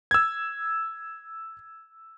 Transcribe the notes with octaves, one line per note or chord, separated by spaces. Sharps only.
E6 G#6